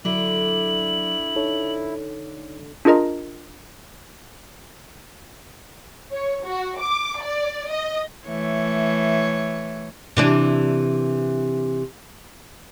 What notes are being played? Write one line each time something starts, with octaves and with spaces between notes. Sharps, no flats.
D3 F#3 E4 F#7
D#4 A4 C#5
D4 F4 G#4 A#4 D#5 A#5
C#5
F#4
D6
D5
D#5
E3 A3 C#5
C3 E3 D4